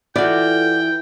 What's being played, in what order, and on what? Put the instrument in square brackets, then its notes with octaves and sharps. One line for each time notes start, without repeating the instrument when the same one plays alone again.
[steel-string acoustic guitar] E3 [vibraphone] F4 A4 [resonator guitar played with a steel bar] F#4 D5 [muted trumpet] G5